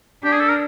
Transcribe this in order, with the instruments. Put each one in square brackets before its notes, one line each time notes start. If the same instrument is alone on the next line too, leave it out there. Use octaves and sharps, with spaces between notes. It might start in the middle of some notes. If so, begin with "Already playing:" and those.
[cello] D4 [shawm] G4
[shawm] G#4
A4
A#4